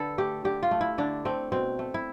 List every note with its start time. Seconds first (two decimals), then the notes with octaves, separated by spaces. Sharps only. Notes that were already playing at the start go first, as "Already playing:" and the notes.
Already playing: D3 A4 B4
0.18 A3 G4
0.45 D3 G4
0.63 F4
0.71 A3
0.81 E4
0.98 D3 D4
1.25 A3 C4
1.52 B2 C4
1.79 A3
1.94 E4